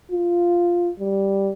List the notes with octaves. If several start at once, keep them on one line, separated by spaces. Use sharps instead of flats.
F4
G3